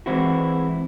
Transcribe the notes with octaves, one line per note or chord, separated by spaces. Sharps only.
E3 G#3 C4 E4 F#4